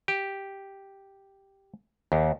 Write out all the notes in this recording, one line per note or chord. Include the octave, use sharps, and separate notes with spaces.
G4
D#2